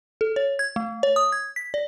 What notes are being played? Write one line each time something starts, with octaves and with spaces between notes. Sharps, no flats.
A4
C#5
G#6
A3
C#5
D#6
G#6
B6
D5